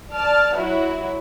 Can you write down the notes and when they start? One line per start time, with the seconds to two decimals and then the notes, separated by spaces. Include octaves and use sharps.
0.10 D5 A5 F6
0.55 F#3 E4 F#4